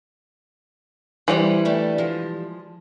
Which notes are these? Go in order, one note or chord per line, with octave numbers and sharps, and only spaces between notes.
E3 G3 E4 C5
A3 D4 G4
F3 G#3